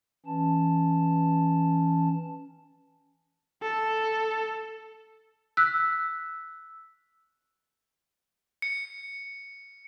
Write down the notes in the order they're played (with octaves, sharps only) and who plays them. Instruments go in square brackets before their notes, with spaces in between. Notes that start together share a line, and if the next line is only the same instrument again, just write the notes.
[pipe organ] E3 C#4 A5
[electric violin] A4
[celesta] E6 F#6 B6
[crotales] C#7